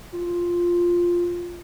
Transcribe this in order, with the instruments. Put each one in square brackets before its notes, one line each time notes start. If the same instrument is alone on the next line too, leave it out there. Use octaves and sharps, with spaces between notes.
[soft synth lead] F4